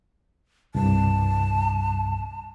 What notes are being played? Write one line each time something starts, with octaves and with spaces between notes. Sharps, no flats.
C2 G2 A5